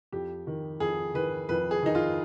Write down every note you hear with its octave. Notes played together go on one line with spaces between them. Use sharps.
F2 G4
D#3
F2 G#4
D#3 B4
F2 B4
G#4
D#3 D#4
F4